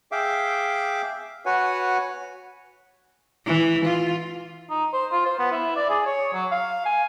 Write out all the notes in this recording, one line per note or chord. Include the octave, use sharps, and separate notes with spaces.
G#4 E5 F5 G5 D6
F#4 B4 C#5 F#5 G#5
E3
F4
D#4
C5
F4
C5
B3
E4
D5
G#4
C#5
F#3
F5
G#5